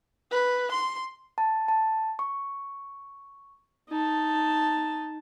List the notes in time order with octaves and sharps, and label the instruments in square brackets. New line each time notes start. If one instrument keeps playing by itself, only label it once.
[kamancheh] B4
C6
[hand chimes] A5
A5
C#6
[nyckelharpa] D#4 A5